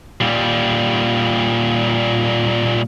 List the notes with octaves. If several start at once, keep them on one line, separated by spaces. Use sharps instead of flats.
A#2 G3